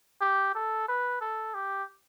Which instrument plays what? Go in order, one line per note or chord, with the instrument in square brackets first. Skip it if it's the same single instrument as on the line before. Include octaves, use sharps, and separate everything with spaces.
[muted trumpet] G4
A4
B4
A4
G4